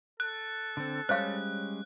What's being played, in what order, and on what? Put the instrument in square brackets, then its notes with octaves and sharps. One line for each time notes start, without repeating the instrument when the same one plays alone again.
[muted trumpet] A4 [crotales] F#6
[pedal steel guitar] D3 C4
[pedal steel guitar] G3 G#3 C#4 [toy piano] C5 C#5 F5 [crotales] F#6